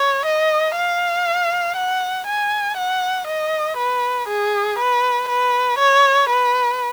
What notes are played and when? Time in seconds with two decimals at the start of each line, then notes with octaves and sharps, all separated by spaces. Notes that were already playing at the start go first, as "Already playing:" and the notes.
Already playing: C#5
0.26 D#5
0.76 F5
1.77 F#5
2.27 G#5
2.77 F#5
3.27 D#5
3.77 B4
4.28 G#4
4.79 B4
5.29 B4
5.79 C#5
6.30 B4